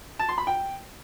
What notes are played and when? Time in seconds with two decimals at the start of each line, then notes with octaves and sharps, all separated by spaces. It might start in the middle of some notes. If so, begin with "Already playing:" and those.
0.19 A5
0.29 C6
0.38 B5
0.47 G5